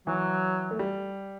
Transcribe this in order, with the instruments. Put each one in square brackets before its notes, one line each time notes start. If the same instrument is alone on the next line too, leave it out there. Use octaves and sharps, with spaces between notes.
[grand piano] E3 [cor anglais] F#3
[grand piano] A3
G3